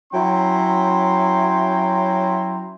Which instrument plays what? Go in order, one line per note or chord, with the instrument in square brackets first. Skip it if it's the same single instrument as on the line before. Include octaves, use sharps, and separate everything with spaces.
[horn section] F#3 C#4 E4 G5 A#5 C6